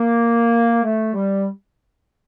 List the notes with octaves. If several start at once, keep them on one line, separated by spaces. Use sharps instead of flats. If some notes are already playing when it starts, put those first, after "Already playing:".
Already playing: A#3
A3
G3